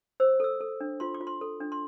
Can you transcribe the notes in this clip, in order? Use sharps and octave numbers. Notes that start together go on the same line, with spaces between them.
C5 E6
A4 E6
A4
D4
F4 C6
D6
F4
C6
A4
D4
C6